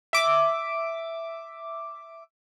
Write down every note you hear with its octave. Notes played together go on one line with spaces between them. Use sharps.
E5 D6